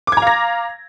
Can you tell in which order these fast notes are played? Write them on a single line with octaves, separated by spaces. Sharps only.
D6 G#6 A#5 F5 A#6